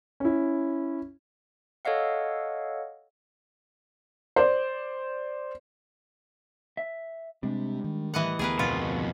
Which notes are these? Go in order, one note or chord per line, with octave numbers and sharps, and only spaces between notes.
C#4 E4
A4 C#5 D#5 F5 F#5
C5 D5
E5
C3 G3 G#3 C4 D4
D#3
A2 E3 G3 D#5 F#5
D2 B3 G4 G#4 A#4 B4 G5 G#5
F2 B2 F4 B4